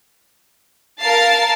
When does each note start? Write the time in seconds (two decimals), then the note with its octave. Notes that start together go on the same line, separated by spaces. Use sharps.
1.00 A#4 F5 A5 A6 C7